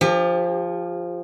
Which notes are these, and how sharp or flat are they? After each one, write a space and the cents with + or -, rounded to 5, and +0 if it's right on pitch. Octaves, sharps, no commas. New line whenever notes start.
F3 +0 G4 +35